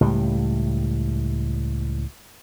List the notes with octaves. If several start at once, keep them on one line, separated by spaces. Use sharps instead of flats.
C#2 A2 G3